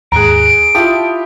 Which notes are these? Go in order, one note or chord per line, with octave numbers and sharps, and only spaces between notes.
D#2 G#2 G#4 A#5 F#6 D7
E4 F4 G4 A5 D#6